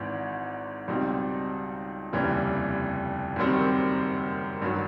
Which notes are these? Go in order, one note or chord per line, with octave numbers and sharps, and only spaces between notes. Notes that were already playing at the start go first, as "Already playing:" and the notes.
Already playing: G#1 G#2 E3
C#2 B2 G3 C4 D#4
F1 D#2 C#3 E3 G3
F#1 F#2 D#3 G3 C4
A1 G2 D#3 F#3